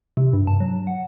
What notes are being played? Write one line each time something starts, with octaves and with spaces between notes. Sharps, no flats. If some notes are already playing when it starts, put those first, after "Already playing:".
C3
G2
A5
F#3
F#5